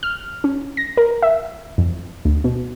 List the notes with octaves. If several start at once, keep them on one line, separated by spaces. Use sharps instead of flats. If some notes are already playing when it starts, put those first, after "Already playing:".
F6
C#4
A#6
A#4
E5
F2
D2
B2